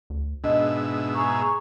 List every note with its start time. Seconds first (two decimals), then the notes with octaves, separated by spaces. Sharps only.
0.10 D2
0.44 G#2 B2 D4 D#4 D#5 E5
1.13 G#4 A#5 C#6